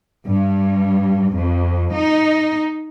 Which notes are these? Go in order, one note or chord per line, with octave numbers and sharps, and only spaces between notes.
G2
F2
D#4